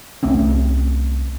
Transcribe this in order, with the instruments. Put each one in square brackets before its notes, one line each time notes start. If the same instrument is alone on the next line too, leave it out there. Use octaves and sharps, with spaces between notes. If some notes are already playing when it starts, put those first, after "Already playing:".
[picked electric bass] C2 A3 C4 C#4